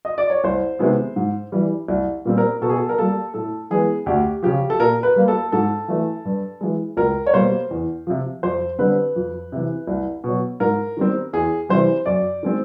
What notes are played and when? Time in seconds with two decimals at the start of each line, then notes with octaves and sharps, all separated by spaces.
0.05 D#5
0.18 D5
0.30 C#5
0.44 C2 C5
0.79 C3 D#3 G#3 B3
1.16 G#2
1.52 E3 G3
1.88 C2
2.25 A#2 G3 C4
2.38 A#4
2.62 B2 A4
2.70 G#4
2.76 A4
2.89 A#4
2.98 G3 A#3 A4
3.34 A2 A4
3.70 E3 G#3 B3 G#4
4.06 D2 G4
4.43 C#3 F3 G4
4.70 A4
4.80 A#2 A#4
5.03 B4
5.16 G3 A#3
5.28 A4
5.52 G#2 A4
5.88 E3 A3
6.25 G2
6.61 E3 G#3
6.97 C#2 A#4
7.27 C#5
7.33 B2 G3 A#3 C5
7.71 E2
8.07 C3 F3
8.43 F2 C5
8.79 D3 G3 C4 B4
9.16 F2
9.52 C3 E3
9.87 C2
10.24 B2 F#3
10.60 G#2 A#4
10.97 D#3 G3 C4
11.33 E2 G#4
11.69 C3 E3 G3 C5
12.06 F#2 D5
12.43 D#3 G#3 C4